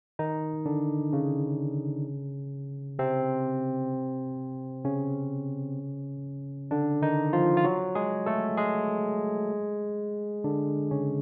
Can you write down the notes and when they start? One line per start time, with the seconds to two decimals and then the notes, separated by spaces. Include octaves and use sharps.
0.19 D#3 D#4
0.66 D3 D4
1.13 C#3 C#4
2.99 C3 C4
4.85 C#3 C#4
6.71 D3 D4
7.02 D#3 D#4
7.33 F3 F4
7.57 F4
7.64 F#3 F#4
7.95 G#3 G#4
8.26 A3 A4
8.57 G#3 G#4
10.44 D3 D4
10.91 C#3 C#4